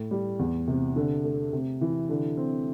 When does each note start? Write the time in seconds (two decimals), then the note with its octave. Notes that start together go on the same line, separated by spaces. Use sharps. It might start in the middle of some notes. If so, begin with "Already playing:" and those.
Already playing: A2
0.11 G3
0.39 E2
0.67 C3
0.96 D3
1.24 A3
1.53 C3
1.81 E3
2.09 D3
2.37 C4